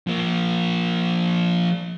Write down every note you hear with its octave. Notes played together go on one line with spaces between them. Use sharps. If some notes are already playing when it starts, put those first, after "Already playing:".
F3 A#3